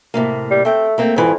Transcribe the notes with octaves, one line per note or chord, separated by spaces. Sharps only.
A2 C3 A#3
G3
A3 C4 G5
A3 A#3 C4
F2 G#2 E3